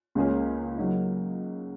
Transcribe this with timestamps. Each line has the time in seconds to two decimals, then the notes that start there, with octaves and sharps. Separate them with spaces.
0.15 C#2 C#3 A#3 C#4 G#4
0.78 C#3 F#3 A#3 D#4